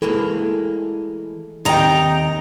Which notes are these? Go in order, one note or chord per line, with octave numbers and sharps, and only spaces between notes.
E3 G#3 A#3 A4
D#2 C3 D#4 D#5 G5 A#5